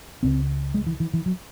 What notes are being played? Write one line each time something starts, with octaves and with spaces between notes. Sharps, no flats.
C#2 C#3 C4
G#3
E3
E3
E3
F#3